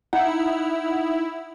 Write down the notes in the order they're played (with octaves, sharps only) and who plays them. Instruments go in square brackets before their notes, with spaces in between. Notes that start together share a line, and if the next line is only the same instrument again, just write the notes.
[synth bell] D#4 F#5 [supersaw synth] E4